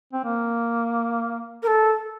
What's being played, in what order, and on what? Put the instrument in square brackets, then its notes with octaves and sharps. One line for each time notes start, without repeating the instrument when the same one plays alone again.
[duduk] C4
A#3
[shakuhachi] A#4
A4